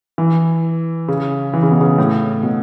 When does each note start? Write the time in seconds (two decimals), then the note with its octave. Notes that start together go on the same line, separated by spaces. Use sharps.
0.18 E3
1.08 C#3
1.54 E3
1.63 C#3
1.71 B2
1.81 C#3
1.98 A2
2.43 B2